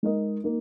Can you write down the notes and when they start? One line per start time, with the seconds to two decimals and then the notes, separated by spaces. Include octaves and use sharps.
0.03 G#3 D#4 A#4 D#5
0.44 A#3 D#4